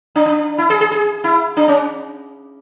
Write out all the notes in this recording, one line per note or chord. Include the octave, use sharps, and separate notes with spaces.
D4
D4
E4
G#4
G#4
G#4
E4
D4
C#4